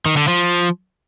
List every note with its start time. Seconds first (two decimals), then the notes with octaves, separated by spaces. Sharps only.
0.06 D#3
0.17 D3
0.28 F3